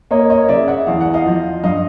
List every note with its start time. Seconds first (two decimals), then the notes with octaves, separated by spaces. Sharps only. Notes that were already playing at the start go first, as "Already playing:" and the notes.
0.11 A#3 C#5 D#5
0.30 C#5 D#5
0.48 C#3 D5 E5
0.68 E5 F#5
0.87 E2 F5
1.01 F#5
1.14 D#5 F5
1.26 F3
1.64 G2 D#5 F5